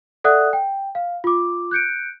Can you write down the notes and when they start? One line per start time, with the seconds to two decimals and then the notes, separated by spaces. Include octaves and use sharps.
0.24 A4 D5 E5 F#5 D#6 F#6
0.53 G5
0.95 F5
1.24 F4 D6
1.71 F#6 G6 C#7 D7